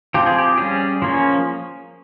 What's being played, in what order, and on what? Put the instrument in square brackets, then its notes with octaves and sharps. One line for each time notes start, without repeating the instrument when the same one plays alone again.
[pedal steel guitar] F3 C4 G4
G#4
G4
G3 C#4 G#4
F3 A#3 C#4